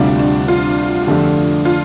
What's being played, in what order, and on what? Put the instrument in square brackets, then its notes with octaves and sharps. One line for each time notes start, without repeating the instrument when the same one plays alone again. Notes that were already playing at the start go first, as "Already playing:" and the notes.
Already playing: [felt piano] D2 C3 G3 F4 [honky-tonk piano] D4
[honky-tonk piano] D4
F4
[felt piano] F2 D3 A3 D4 G4
[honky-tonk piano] F4